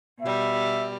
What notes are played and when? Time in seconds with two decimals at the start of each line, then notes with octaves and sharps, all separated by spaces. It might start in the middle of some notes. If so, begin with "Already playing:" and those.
0.21 B2 G3 E5